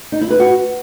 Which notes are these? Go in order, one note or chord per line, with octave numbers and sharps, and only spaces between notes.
D#4
E4
B4
F#4